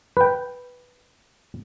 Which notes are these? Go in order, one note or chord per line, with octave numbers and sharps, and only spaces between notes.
B4 G5